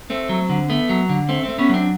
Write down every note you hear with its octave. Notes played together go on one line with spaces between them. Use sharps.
A3 C4
F#3
D3
A3 B3
F#3
D3
A3 C4
C4
A3
B3 C#4
F#3 C4 D4